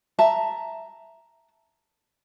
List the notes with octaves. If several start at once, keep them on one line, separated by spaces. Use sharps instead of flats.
E5 A5 A#5